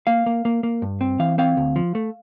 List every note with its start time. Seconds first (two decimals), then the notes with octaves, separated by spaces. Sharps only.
0.07 A#3 F5
0.26 A#3
0.45 A#3
0.63 A#3
0.82 G2
1.01 C4
1.19 E3 F5
1.38 C4 F5
1.57 D2
1.76 F3
1.95 A3